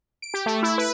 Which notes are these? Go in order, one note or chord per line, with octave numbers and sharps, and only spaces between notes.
D7
G4
A3
E4
B4